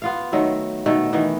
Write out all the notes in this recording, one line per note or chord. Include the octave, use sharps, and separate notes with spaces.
B3 F4 F5
D#3 F#3 A3
B2 D#3 A3
D#3 E3 B3